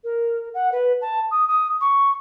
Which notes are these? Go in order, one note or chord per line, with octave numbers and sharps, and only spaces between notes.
A#4
F#5
B4
A5
D#6
D#6
C#6